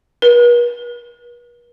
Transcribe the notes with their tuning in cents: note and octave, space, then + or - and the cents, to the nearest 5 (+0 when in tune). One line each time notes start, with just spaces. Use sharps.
B4 -45